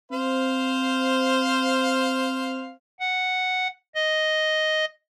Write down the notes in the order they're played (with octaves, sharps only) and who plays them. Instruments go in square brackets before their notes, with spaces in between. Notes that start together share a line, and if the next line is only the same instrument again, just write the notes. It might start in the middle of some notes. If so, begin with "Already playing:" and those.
[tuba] C4 [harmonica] C5 F5
[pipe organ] F#5
D#5